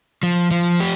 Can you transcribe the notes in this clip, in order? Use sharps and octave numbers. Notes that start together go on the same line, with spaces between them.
F3
F3
G4